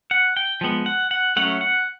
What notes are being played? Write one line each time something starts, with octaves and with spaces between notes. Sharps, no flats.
F#5
G5
F3 G#3 B3
F#5
F#5
F#3 A3 C#4 F#5
F#5